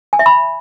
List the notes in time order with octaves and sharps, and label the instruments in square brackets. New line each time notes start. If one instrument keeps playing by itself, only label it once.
[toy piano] G#5
E5
B5